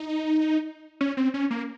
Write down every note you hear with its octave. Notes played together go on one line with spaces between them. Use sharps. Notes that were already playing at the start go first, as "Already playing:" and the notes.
Already playing: D#4
C#4
C4
C#4
A#3